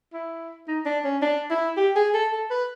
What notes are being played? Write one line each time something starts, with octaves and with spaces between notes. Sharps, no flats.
E4
D#4
D4
C#4
D4
E4
G4
G#4
A4
A4
B4